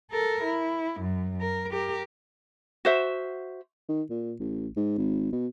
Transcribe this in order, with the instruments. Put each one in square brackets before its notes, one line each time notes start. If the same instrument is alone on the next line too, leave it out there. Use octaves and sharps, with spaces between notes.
[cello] A4 A#4
E4
F#2
A#4
G4 A#4
[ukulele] F#4 C5 E5
[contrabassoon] D#3
A#2
A1
G#2
G#1
B2